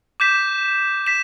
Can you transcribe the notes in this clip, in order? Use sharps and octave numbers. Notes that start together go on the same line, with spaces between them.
D6 G6 B6 E7
B6 E7